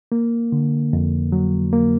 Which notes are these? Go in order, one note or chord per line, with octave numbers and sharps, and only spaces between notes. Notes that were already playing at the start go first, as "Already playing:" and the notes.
A#3
D3
F2
F#3
A#3